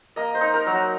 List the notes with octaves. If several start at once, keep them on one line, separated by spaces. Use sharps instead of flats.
A#3 D#5
C5
D#4
A#4
F#3
F#4